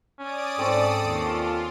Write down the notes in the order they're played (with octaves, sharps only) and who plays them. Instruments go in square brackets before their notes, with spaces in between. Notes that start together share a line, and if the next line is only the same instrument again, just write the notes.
[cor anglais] C#4 [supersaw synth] D5 D#6 D7
[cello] G#2 [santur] C4 C#4 C#5 [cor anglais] A4
[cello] D#2 [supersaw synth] F4